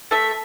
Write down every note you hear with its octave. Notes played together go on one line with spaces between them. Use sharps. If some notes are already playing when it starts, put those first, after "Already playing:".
A3 E5